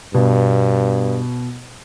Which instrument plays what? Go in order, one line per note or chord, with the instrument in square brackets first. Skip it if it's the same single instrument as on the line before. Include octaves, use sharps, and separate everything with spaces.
[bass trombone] G2 [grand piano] B2